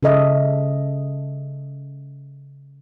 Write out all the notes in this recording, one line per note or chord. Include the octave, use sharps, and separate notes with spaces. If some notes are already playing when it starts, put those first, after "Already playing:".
C#3 A4 D#5 E5